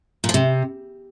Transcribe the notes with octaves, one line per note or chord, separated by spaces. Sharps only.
A#2
F3
C3